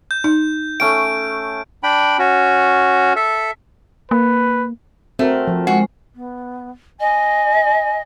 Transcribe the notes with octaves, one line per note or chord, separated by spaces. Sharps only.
G6
D#4
A3 C#4 G5 D7
D4 G5 B5
C#4 F#4
A4 E5
A#3 B4
A3 C4 F#4 A#4
F3
G#3 F#4
B3
D#5 G#5